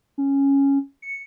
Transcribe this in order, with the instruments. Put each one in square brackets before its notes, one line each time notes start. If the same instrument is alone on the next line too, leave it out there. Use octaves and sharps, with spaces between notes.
[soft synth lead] C#4
C#7